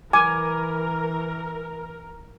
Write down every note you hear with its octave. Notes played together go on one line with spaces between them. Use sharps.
E3 A#4 G#5 D6